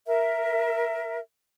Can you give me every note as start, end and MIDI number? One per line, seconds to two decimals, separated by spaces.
0.06 1.19 70
0.06 1.19 76